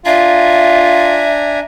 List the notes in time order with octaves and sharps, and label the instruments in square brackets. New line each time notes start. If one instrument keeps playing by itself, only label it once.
[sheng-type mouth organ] D4 G#5 A#5 [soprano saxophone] F4 [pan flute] E5